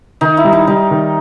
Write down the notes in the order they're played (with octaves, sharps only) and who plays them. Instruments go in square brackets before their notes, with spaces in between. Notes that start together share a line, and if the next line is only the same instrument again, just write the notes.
[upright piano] D#3 [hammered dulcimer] D#4
[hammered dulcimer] E4
[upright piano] G3
[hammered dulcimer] D#4
[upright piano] G3 [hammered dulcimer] D#4
[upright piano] D#3